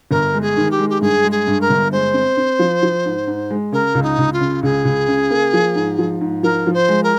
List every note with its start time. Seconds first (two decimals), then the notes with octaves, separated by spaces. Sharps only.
0.11 G1 A#4
0.34 G#3
0.42 G#4
0.57 D#3
0.71 G4
0.79 G#3
0.90 G4
1.01 G2 G#4
1.25 G#3
1.31 G#4
1.47 G2
1.61 A#4
1.70 G1
1.92 G#3 C5
2.14 C4
2.37 C4
2.59 F3
2.83 F3
3.05 G#2
3.27 G#2
3.50 G#3
3.72 C#3 A#4
3.95 C#2
4.03 D#4
4.18 C#2
4.33 F4
4.40 C#3
4.63 C#2 G#4
4.85 C#2
5.08 C#3
5.30 A#3
5.53 F3
5.75 G#2
5.99 F3
6.21 G#2
6.43 F3 A#4
6.67 F3
6.74 C5
6.89 G#3
7.04 A#4